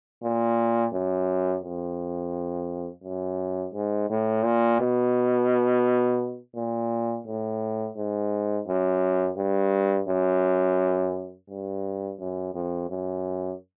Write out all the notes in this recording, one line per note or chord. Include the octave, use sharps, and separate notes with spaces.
A#2
F#2
F2
F#2
G#2
A2
A#2
B2
A#2
A2
G#2
F#2
G2
F#2
G2
F#2
F2
F#2